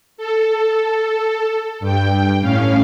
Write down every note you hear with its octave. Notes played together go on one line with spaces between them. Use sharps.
A4
G2 G5
A2 C#4 F5